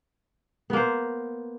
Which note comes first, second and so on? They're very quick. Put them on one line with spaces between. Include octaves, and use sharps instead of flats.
B3 A#3 C5